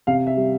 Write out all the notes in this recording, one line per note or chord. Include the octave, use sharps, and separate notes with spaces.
C3 F5
E5
G3